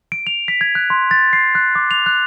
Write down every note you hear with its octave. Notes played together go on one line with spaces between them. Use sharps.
D7
F7
B6
G#6
F#6
C6
A6
C7
F#6
D6
F7
F#6